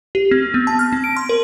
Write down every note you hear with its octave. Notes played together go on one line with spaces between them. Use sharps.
G4
C4
B3
A5
F6
C4
D7
C6
A#4